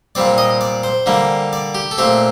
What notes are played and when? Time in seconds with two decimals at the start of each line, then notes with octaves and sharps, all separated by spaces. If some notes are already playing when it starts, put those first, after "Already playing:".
0.15 A#2 G3 C4 D5
0.38 D#5
0.61 D5
0.83 C5
1.06 D3 G3 A#3
1.53 D5
1.75 G4
1.91 A4
1.98 A#2 A3 C4 G4